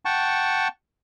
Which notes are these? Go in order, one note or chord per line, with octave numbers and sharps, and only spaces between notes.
F#5 G5 A5 C#6